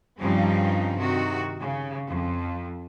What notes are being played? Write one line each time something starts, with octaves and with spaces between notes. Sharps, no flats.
G2 C#3 F3 G3 C4 D#4
C3 D#3 F#4
C#3
F2